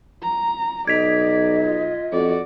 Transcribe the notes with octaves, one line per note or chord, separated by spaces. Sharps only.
A#5
B1 D5 D#5 G#6 B6
F4
F2 F#4 D5